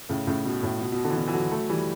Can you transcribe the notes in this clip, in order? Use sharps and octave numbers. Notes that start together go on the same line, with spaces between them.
A2 C#3
A2 C#3
B2
A2
B2
B2
B2 D3
E3
B2 D3
E3
D3 F#3
F#3 A3
E3 G3